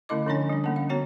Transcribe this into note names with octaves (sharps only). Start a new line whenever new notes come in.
D3 A3 C#4 E4 D#5 D6
D3 F3 C#4 D4 C#5 G#5
G3 D4
D3 A#3 C#4
F5
B3 F#4 C#5 A#5